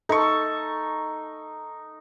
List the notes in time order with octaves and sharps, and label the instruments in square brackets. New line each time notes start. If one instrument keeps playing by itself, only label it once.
[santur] D#4 C#6 [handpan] A4